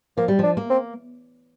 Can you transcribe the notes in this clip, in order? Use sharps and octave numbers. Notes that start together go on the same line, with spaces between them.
F3 A#3
G3
F3 D4
A#3
C4